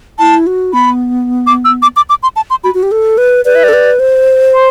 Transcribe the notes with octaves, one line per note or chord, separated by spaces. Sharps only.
E4 A5
F#4
B3 B5
D6
E6
D6
D6
D6
C6
A5
C6
F#4 B5
F#4
G4
A4
B4
B4 D5
E5
D5
A4
B4
C5
C6